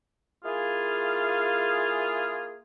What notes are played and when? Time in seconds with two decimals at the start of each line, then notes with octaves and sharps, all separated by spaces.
0.44 A#3 E4 F4 G#4